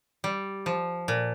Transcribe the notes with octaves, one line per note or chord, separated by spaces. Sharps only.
G3
F3
A#2